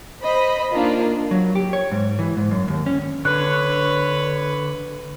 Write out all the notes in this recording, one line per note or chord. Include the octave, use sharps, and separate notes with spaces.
C5 D#5 B5
A#3 D4 D#4 F4
F#3
G4
C#5
G#2
E3
G#2
F#2
D#2
C#4
D3 B4 C#5 F#6